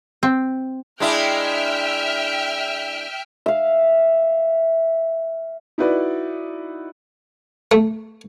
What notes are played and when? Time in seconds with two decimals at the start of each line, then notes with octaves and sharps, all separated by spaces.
0.23 C4
1.00 G#3 D4 E4 E5 G5 F6
3.46 E5 F5
5.78 D#4 E4 F#4 B4 D5
7.72 A3